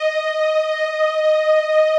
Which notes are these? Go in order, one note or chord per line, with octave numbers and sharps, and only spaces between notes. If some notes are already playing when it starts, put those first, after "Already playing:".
Already playing: D#5
D#5